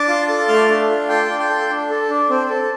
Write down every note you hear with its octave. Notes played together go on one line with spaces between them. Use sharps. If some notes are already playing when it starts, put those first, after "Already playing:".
Already playing: D4 A5 D6
F4
A4
A3 C6 F6
D4
F4
A4 G5 C6
D4
G5 C6
A4
D4
A4
D4
C4
A4